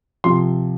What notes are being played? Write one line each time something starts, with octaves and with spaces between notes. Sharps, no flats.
C3 F3 C6